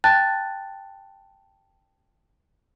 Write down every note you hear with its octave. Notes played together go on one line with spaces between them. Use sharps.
G5 A5 F#6 A6